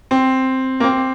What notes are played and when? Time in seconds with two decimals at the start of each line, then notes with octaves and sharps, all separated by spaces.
0.11 C4
0.80 A#3
0.84 C4